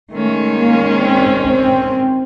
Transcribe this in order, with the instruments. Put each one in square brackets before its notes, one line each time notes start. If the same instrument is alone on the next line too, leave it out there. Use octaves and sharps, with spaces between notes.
[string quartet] D#3 G#3 C#4 [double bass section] A3
[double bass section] A#3
C4
C4